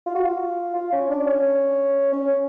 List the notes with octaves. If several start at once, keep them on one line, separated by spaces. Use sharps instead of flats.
F4
F#4
F4
F4
C#4
D4
C#4
C#4